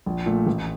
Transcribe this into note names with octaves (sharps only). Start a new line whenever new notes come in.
A#1
A#2 A3
A1